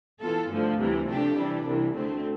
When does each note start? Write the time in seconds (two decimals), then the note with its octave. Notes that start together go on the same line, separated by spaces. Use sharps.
0.21 E3 B3 F4 A4
0.50 G2 D3 F3 A3
0.79 D2 C3 E3 G3
1.09 C3 F3 A3 D4 G4
1.37 C3 E3 G3 D4
1.66 C2 C3 E3
1.95 D2 D3 A3 C4